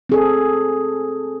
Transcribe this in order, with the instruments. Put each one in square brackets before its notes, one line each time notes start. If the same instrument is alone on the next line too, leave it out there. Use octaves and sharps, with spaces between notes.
[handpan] C4 G#4 A4